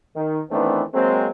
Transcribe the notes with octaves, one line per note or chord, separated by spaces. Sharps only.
D#3
D#3 E3 A3 B3 C4 D4
F#3 G#3 A#3 C4